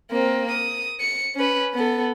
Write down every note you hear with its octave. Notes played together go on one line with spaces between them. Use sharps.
A#3 C4
D#6
C#7
C#4 B4
B3 A4